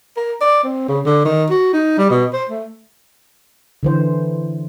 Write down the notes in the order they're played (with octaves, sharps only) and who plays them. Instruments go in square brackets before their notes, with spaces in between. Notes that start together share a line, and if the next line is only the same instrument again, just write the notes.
[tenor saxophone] A#4
D5
C4
C#3
D3
D#3
F#4
D#4
G3
B2
C5
A3
[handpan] D3 E3 C5